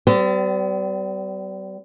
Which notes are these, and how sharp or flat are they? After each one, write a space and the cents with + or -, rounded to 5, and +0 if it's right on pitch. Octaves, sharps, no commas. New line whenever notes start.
G3 -35 B3 +45